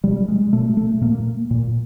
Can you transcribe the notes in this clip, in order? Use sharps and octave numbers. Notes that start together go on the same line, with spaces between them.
B2 G3
G#3
B2 A3
A3
A#2 A#3
A#2